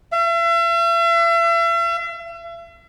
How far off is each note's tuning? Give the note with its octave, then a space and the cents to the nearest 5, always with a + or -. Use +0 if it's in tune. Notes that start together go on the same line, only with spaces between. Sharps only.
E5 +40